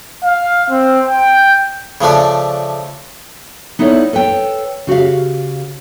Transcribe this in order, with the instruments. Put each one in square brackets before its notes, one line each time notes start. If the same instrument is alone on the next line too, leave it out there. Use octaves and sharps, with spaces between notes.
[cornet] F5
C4
G5
[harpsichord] C#3 F3 A3 D4
[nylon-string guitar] B3 D#4 E4 A4 C#5 D5
A4 B4 C#5 G5
C#3 F#4 G4 F5